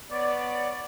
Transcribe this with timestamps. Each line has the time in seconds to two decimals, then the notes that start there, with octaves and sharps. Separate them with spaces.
0.11 B3 C#5 D5